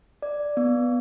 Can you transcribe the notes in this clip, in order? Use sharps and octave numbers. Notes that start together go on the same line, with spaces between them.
D5
B3